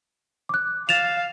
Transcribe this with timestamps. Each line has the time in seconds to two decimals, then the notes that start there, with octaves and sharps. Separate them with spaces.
0.49 D6 F#6
0.89 F5 A6 E7 F7